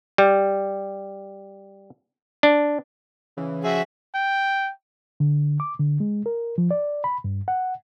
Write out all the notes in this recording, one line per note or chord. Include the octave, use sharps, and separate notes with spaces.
G3
D4
C#3 E3
F3 F#4 G#4 E5
G5
D3
D6
D3
G#3
A#4
F3
D5
B5
G2
F#5